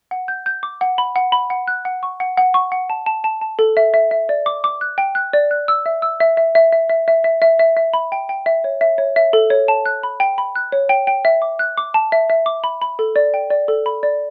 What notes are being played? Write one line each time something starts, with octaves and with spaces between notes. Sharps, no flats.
F#5
G6
G6
D6
F#5
B5
F#5
B5
F#5
F#6
F#5
C#6
F#5
F#5
C#6
F#5
A5
A5
A5
A5
A4
E5
E5
E5
D5
D6
D6
F#6
G5
F#6
D5
F#6
E6
E5
E6
E5
E5
E5
E5
E5
E5
E5
E5
E5
E5
B5
G5
G5
E5
C#5
E5
C#5
E5
A4
C#5
A5
F#6
B5
G5
B5
F#6
C#5
G5
G5
E5
D6
F#6
D6
A5
E5
E5
D6
B5
B5
A4
D5
G5
D5
A4
B5
D5